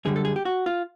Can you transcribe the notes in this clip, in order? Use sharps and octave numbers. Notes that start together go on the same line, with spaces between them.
F#2 D3 G3 G#4
A4
G#4
G4
F#4
F4